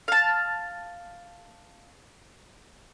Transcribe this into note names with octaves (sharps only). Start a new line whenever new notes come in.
F5 A5